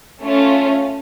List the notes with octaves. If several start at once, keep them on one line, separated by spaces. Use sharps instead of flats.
A3 C#4 F4